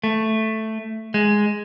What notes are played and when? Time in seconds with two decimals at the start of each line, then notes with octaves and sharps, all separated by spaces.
0.04 A3
1.14 G#3